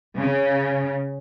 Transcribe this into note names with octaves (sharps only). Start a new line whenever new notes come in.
C#3